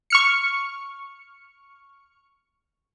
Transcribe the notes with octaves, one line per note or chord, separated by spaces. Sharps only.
C#6 F6 C#7